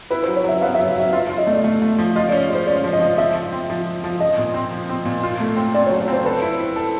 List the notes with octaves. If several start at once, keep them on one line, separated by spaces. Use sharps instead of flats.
E4 B4
C5
F#3
C#5
F#3 E5
B3 F5
E5
F#3
F#3 E5
F4 E5
F4
D#5
A3 D5
A3
A3
F3
F4 D#5
D5
C#4
G#3 C5
C#4 D5
F3
D#5
F3
F3 E5
F3
C4
F3
F3
F3
F3 D#5
A#2
C4
F3
C4
A#2
F4
A3
C4
C4 D5
C#5
F#3
C#5
C4 C5
A4 B4
E4
E4
A4